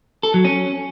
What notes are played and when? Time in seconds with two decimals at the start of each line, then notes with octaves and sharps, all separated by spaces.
0.23 A4
0.34 F#3
0.45 C#4